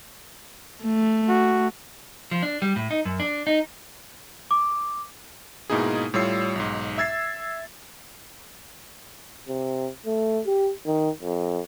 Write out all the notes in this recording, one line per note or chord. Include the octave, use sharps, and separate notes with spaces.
A3
F#4
F3
D4
G3
A2
D#4
F#2
D4
D#4
D6
G#2 B2 A#3 D#4 E4 G#4
A2 G3 F4 C#5 E6 C7
B1 G#2
E5 E6 G#6 A6 C7
C3
A3
G4
D#3
F2